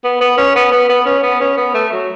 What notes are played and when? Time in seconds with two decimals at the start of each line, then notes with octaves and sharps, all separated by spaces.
0.04 B3
0.21 B3
0.37 C#4
0.55 B3
0.72 B3
0.89 B3
1.06 C#4
1.23 B3
1.41 C#4
1.57 B3
1.74 A3
1.92 F#3